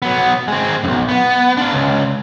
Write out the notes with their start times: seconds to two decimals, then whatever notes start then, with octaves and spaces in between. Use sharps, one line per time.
0.02 F#3 B3
0.48 G#3 C4
0.84 B1 F#2
1.08 B3
1.57 D4 F4
1.73 C#2